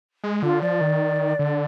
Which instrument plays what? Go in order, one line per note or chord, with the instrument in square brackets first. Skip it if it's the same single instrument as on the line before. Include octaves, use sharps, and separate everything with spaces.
[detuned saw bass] G#3
[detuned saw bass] D3 [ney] F4
[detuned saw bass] F3 [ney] D5
[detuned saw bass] D#3
D3